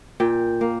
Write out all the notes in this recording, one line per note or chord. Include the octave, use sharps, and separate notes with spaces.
A#2 G5
A#3